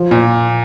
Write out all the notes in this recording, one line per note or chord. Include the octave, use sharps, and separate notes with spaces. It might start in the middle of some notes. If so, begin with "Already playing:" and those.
Already playing: F3
A#2